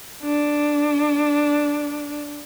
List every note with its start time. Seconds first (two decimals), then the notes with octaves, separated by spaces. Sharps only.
0.23 D4